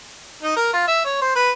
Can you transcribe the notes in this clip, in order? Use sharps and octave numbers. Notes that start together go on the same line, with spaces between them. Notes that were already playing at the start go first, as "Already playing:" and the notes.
D#4
A#4
F4
E5
C#5
C5
B4